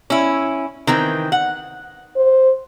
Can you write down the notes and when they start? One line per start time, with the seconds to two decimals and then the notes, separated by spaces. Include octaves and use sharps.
0.10 C#4 E4
0.87 D#3 E3 C4
1.32 F#5
2.16 C5